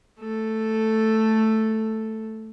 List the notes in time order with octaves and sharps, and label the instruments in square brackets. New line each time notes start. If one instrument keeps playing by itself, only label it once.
[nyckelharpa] A3 A4